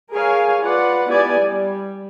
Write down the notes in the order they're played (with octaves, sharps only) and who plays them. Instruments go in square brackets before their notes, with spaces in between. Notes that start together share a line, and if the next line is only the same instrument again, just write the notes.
[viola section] G#4 A#4 C#5 F5 G#5
F4 B4 D5 F#5
B3 E4 G4 D5 G#5
G3